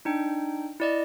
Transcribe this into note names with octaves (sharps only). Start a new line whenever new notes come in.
D4 D#4 G5
E4 D5 D#5